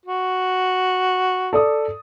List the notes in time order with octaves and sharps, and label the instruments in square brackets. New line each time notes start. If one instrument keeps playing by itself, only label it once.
[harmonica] F#4
[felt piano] A4 D5 D#6